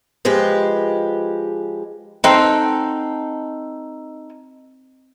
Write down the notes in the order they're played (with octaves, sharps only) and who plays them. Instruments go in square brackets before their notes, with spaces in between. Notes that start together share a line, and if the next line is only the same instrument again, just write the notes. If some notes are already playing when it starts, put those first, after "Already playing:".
[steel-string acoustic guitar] F3 G#3 G4 B4
[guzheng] C4 F#5 [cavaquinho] D#4 A4 G5